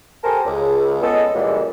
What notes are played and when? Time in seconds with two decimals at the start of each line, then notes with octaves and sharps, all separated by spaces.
0.24 G4 A4 A#4 C5 G#5 A5
0.45 C#2
1.03 G#3 B3 C#4 A4 D#5
1.34 F#2 A#2 C#3 E3 G3 G#3